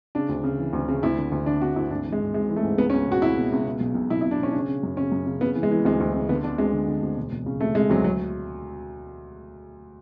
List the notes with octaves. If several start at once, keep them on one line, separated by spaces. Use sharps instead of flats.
C#3 D4
D2
C#3
E3
D2
C#3
D2 E4
D3
D2
D3 D4
D2 F#4
D2 E4
G#1 D4
E3
G#3
G#1
G#2 G#3
E3
A3
G#2
C#2 B3
C#4
C#2
B2 F#4
C#2 E4
B2
C#2
B2
B1
B1
B1 E4
E4
B2
D4
B2 C#4
C#3 D4
C#4
C#3
F#2
C#3 C#4
F#2
C#3
C#3 B3
E3
G#3
E3
D2 G#3
D2
C#3
D3 B3
D3 D4
D2 G#3
D3
D3
D2
E1
E1
C#3
C#3 A3
C#3 G#3
D2 F#3
F#3